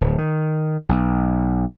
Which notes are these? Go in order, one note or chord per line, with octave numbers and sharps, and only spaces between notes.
D1
D#3
B1